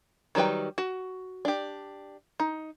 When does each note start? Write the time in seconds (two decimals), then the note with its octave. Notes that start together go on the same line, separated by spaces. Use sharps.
0.35 D#3 F#3 G3 B4 G5
0.78 F#4
1.45 D4 G4
2.40 D#4